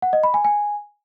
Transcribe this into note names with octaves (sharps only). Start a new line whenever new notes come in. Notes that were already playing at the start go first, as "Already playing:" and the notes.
F#5
D#5
B5
G#5
G#5